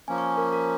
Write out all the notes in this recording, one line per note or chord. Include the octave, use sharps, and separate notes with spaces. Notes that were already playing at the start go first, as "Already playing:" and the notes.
F3 A#3 C#4 G#5
C#6
A#4
A#4